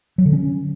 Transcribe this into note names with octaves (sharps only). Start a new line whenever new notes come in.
F#3
D3
C#4